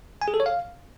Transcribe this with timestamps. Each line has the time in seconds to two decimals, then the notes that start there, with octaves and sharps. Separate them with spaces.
0.22 G#5
0.28 G#4
0.34 A4
0.40 C#5
0.46 F5